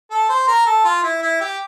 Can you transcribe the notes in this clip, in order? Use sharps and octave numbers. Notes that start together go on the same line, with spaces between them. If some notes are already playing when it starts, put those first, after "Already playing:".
A4
C5
A#4
A4
F4
E4
E4
G4